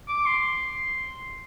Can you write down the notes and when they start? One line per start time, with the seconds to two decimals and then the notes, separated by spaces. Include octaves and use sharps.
0.08 D6
0.26 C6